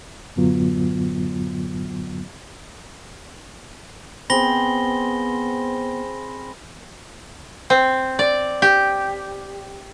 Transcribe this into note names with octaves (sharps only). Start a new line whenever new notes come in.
F#2 A2 D3 F#3 B3 F4
B3 C4 G#4 B5 A#6 G7
C4
D5
G4